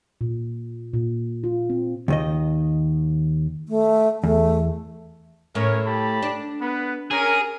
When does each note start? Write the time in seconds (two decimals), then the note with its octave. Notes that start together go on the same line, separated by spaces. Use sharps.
0.21 A#2
0.94 A#2
1.44 F4
1.70 C4
2.08 D#2 D#3 D#5
3.69 A3
4.24 E2 A3
5.55 A2 C#4 A#4 C#5
5.85 G4 A5 B5
6.22 D4
6.60 B3 B4
7.11 C#4 G#4 A#4